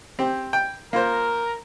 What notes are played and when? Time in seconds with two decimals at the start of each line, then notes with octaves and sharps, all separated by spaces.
0.19 C4 G4
0.53 G5
0.93 A#3 F4 A#4 C5